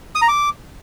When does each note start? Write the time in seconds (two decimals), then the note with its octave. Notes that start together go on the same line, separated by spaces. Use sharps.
0.15 D#6
0.22 A#5
0.28 D6